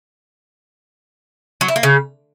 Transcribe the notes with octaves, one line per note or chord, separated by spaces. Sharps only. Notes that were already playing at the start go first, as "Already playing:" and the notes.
F#3
E4
A#3
C#3